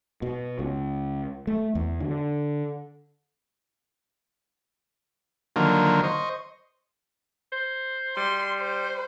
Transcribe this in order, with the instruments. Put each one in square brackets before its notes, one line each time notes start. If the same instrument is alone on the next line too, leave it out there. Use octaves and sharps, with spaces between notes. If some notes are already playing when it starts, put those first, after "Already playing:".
[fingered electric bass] B2
C#2
A3
E2
D3
[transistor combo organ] D3 D#3 F3 F#3 A#3
C5 D#5 C#6
[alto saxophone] C5
[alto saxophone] G3 [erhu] C6
[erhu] C5